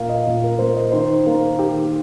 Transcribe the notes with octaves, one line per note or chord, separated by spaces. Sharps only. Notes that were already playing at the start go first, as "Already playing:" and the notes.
Already playing: A#2 A#3 F5
D#5
A#2
A#4
A#3 C5
D#5
D#3 C5
A#3
D#3 G4